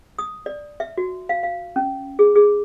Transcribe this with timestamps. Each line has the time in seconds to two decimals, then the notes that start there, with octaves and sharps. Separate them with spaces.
0.19 D#6
0.46 D5
0.80 E5
0.97 F#4
1.29 F5
1.43 F5
1.76 C#4
2.19 G#4
2.36 G#4